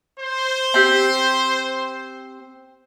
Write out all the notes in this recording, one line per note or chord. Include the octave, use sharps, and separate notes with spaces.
C5
C4 G4